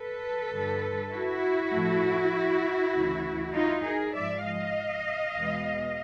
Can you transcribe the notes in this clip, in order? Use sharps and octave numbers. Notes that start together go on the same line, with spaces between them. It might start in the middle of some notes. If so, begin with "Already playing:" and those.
Already playing: A4 B4
G2 D3 G3
E4 F#4
A2 F3 A3
D2 C#3 E3
D#4 F4
G#4 A#4
G#2 F3 G#3 D5 E5
D#5 F5
E2 B2 G#3 B3